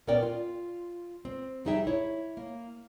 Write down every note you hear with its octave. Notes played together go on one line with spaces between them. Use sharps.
A#2 B3 C#4 A#4 D5 G5
F4
C4
F2 G3 D#4 G#4 E5 G5
E4 C#5
A#3